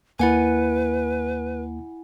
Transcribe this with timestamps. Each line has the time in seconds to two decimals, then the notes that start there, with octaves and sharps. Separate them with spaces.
0.19 D#2 A#3 E4 B4 F#5 G#5